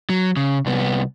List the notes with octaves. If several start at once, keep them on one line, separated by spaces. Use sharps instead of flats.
F#3
C#3
C2 B3